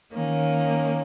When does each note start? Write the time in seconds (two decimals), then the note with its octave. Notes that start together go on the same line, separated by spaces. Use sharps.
0.13 D#3 A#3 C#4